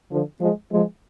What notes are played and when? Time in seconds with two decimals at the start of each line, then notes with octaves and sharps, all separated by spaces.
0.11 D3 F3
0.41 F3 G#3
0.72 F3 G#3